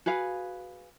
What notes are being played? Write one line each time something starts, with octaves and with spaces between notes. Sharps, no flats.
F#4 G#4 B4 F5